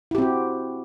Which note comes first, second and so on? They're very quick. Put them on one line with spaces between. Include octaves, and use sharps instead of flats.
E4 G4 C4 F#4